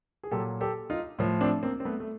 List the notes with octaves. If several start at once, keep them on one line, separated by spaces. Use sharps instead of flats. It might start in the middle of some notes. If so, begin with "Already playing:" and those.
G#4
A#2 F#3 G4 A4
G4 A4
D#4 F4
A2 F3
C4 D4
A#3 C4
C4
A3 B3
A3